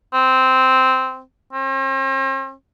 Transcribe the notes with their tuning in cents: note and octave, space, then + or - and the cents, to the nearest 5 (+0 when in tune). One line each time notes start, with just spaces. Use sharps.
C4 -10
C4 +45